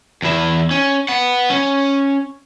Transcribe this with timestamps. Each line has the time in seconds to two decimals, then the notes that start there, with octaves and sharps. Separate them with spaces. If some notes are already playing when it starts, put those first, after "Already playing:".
0.22 E2 E4
0.71 C#4
1.08 B3 F#5
1.50 C#4